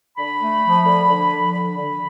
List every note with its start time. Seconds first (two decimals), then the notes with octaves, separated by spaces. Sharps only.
0.18 D3 B5
0.40 A3
0.64 F3
0.85 D3
1.09 D3
1.31 F3
1.53 D3 B5
1.77 D3